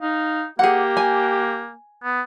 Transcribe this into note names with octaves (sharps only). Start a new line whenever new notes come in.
D#4 F5
A#3 G4 G#4 F#5
G#5
B3